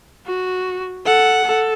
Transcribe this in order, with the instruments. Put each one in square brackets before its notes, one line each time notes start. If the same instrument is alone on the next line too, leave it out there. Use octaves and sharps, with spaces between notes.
[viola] F#4
[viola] A4 [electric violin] F#5
[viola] A4